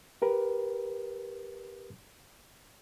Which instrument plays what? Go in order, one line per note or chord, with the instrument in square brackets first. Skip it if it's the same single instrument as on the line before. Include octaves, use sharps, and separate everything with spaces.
[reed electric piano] G4 A#4 B4